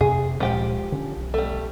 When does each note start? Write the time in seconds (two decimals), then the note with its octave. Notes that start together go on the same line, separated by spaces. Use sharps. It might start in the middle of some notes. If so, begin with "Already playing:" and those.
0.01 F2 C3 G#4
0.40 D1 A#2 F3 G#3 G4 G5
0.92 D3 C#4
1.16 B1
1.34 G3 A3